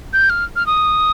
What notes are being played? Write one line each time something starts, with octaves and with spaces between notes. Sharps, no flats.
G6
F6
F6
D#6